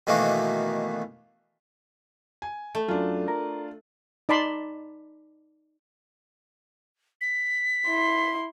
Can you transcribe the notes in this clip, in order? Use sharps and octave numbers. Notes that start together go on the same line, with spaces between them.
B2 D#3 E3 A3 A#3 D4
G#5
A3
F#2 D4 F4
A#4
D#4 D5 A5 B5 C6
B6
E4 C6